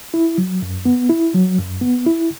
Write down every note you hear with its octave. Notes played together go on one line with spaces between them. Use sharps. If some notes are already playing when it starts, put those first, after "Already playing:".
E4
F#3
F#2
B3
E4
F#3
F#2
B3
E4